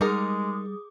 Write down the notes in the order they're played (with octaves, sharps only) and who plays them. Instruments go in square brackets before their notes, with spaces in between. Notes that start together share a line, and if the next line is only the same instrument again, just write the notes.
[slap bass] G3 [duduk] G#3 [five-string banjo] D#4 A#4 [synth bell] G#4 D6 D#6